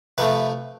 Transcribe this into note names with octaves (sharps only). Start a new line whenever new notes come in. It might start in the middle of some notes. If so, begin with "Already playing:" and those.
C3 F3 A3 B4